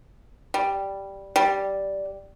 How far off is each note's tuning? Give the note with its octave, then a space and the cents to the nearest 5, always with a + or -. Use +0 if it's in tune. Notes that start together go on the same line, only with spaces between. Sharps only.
G3 +0
G3 -5